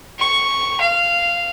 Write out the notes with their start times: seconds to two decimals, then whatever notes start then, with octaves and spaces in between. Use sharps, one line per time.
0.19 C#6
0.81 F5